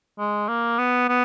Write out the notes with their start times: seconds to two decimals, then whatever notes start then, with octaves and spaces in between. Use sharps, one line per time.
0.19 G#3
0.48 A#3
0.78 B3
1.09 B3